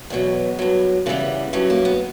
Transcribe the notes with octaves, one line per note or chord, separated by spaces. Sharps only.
E2 B2 F#3 B3
G2 F#3
E2 C#3 E3 G3 B3
G2 F#3 C#4
A#3
B3